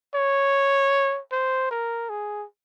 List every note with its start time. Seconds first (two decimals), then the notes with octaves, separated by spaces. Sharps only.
0.15 C#5
1.32 C5
1.71 A#4
2.09 G#4